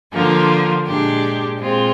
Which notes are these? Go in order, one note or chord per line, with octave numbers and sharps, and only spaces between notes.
D3 F3 A#3 F4
A#2 G#3 D4 G4
A#2 G#3 C4 F4